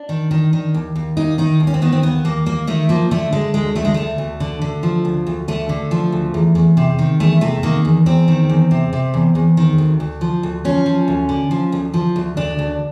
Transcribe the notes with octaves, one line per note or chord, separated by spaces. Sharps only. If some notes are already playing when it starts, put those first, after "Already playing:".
Already playing: D4
D#3
D#3
D#3
D#2
D#2
D#2 D#4
D#3 D#4
D#2
C#4
C4
D#3 B3
C4
D#2 B3
D#2 A#3
D#2 A#3
D#3 A3
F3 A#3
D3 A3
D3 G#3
D2 G#3
D2 A3
G#3
D2 A3
D2
D3
D3
F3
D2
D2
D3 A3
D3
F3
D2
E2
E2
C3
D#3
E2 A3
C3 A3
D#3 A#3
E2
E2 C4
D#3
E2
C3
C3
E2
E2
D#3
D2
D2
F3
D2
F3 C#4
F3
D2
D3
F3
D2
F3
D2
D2 D4
D2